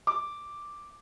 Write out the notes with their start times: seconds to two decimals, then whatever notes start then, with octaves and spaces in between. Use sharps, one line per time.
0.07 D6